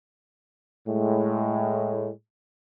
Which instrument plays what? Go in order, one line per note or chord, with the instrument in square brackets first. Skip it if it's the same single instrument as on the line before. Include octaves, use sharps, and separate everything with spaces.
[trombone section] A2 G#3